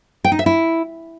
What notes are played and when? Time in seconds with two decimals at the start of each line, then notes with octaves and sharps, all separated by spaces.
0.25 G5
0.32 D#4
0.39 E5
0.46 E4